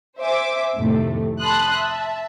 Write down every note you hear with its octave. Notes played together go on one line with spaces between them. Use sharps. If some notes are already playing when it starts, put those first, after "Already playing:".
C5 E5 G#5 D6
F2 A2 C3 D#3 A3
A5 B5 C6 D#6 F#6
E5 A5